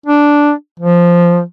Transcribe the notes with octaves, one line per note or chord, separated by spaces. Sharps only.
D4
F3